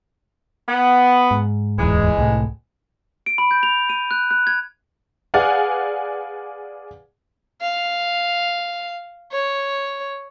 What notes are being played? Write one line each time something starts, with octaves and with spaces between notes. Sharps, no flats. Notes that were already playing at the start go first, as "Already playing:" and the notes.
B3
G#2
D1 E2 G#2 E3 G#3
C2 A2
D7
B5
G6
F7
D#7
F#6
F#6
G#6
G#4 B4 D5 F5 F#5 G#5
F5
C#5